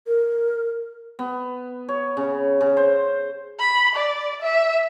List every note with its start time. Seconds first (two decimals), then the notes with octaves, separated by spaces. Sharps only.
0.07 A#4
1.19 B3
1.89 C#5
2.17 C#3
2.61 C#3
2.77 C5
3.60 B5
3.95 D5
4.42 E5